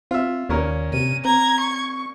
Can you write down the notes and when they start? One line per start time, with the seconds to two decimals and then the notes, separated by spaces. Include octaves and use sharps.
0.11 C4 F4 E5
0.49 D#2 A#2 C#4 A#4
0.93 C3 D#7
1.25 C4 A#5 G#6
1.60 C#6